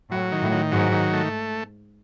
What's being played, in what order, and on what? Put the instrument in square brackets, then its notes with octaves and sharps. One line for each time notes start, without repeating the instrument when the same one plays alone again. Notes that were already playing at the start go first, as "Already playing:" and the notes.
[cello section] A2 [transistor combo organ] F#3
[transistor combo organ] D#3
[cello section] A2
[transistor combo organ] D#3
[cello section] G#2 [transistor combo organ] F#3
[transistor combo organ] D#3
A3